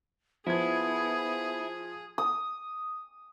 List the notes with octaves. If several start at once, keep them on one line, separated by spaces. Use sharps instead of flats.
F3 B3 E4 G#4 G#6
D#6